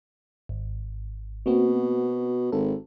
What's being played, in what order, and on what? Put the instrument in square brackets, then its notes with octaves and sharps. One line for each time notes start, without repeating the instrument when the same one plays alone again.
[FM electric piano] G#1
[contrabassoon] B2 [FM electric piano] A#3 C4 F#4
[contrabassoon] G#1 [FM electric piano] A4